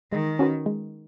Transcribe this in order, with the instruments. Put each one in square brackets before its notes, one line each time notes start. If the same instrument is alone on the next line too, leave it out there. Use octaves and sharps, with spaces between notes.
[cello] D#3 [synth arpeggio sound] G#3
[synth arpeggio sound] C#4 F#4 B4
G#3